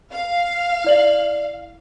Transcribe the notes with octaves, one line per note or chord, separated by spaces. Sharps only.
F5
E4 D5 F#7